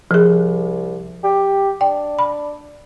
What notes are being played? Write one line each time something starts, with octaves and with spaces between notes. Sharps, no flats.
C2 F3 G#4
G4
D4 G5
B5